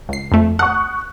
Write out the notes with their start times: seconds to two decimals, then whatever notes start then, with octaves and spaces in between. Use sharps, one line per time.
0.09 C#2 C7
0.32 F2 A3
0.59 F#5 C#6 D#6 F#6